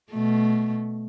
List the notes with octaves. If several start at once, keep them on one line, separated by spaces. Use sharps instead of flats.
B2 A3